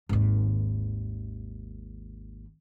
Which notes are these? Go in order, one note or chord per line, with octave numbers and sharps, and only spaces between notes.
G#1 D#2